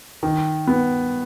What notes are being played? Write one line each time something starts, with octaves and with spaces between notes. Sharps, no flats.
D#3
B3